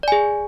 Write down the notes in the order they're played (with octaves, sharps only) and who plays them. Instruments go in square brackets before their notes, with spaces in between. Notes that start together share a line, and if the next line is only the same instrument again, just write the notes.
[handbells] D5
G#5
G#4